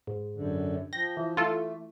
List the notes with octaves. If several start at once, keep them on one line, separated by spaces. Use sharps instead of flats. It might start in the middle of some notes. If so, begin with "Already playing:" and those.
G#2
F#2 D3
F3 G5 A#6
E3
A3 F4 A4